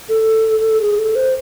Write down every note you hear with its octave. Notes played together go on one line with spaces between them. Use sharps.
A4
G#4
A4
C5